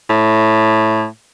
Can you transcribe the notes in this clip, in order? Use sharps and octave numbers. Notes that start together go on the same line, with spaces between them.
A2